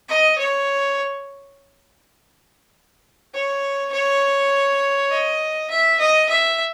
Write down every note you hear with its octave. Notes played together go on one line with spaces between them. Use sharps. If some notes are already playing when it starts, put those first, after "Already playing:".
D#5
C#5
C#5
C#5
D#5
E5
D#5
E5